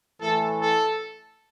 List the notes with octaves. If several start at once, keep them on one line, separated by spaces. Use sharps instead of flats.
A2 E3 A3 A4
A4